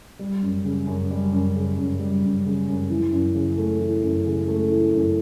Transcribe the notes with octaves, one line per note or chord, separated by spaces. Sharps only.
G3
F#2
C#3
F#2
G3
F#2
C#3
F#2
G3
F#2
C#3
F#2
E3
F#2
C#3
A3
E3
F#2
C#3
A3
E3
F#2